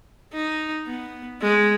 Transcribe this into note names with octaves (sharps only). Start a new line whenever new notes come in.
D#4
B3
G#3